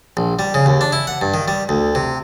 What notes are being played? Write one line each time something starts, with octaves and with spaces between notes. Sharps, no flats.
A#1
G3
C#3
D#2
D4
E4
F#5
G2
D#3
G3
D2
C3